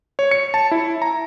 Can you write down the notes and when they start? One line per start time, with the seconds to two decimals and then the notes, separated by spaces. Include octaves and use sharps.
0.19 C#5
0.31 C#7
0.54 A5
0.71 E4
1.02 A#5